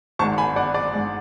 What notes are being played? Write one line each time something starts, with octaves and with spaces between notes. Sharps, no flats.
G#1 G#2 G#3 A5 C#6
G#5 B5
D5 F#5
D5
G#2 G#3